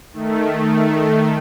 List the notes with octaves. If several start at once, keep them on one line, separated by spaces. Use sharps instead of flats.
D#3 A3